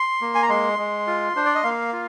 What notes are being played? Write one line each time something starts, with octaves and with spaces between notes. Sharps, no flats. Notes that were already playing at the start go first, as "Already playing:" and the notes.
Already playing: C6
A#3
G#5
A#5
G#3 C6
G#3
F4
D4 C5
D5
D#5
A#3 F5
F4